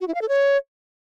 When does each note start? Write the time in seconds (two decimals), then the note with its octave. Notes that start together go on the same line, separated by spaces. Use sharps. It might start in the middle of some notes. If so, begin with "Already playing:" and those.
0.01 F#4
0.08 E4
0.15 F5
0.22 A4
0.29 C#5